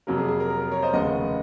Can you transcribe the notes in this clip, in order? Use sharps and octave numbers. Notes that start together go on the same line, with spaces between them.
F2 C3 F#3 A#3 A#4
G#4
G#4
A#4
A#4
A#4
A#4 C#5
C5 D#5
F1 D#2 C#3 D#5 F#5